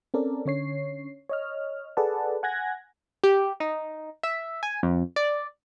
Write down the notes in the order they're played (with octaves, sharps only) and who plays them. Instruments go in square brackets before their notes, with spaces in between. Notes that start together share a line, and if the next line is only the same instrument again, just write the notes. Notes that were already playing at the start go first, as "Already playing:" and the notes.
[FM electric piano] C4 C#4 A4 A#4 D5
D3 C#4 C#5 C7
C#5 D#5 F6
G#4 A4 B4 D5 F#5 A5
F#5 G#5 F#6 G#6 A#6
[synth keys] G4
D#4
E5
G#5
F2
D5